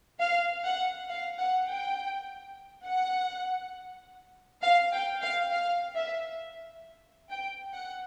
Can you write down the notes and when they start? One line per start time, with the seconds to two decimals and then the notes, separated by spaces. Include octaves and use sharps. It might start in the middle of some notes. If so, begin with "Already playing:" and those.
0.20 F5
0.64 F#5
1.09 F5
1.38 F#5
1.68 G5
2.85 F#5
4.62 F5
4.92 G5
5.22 F5
5.51 F5
5.96 E5
7.29 G5
7.73 F#5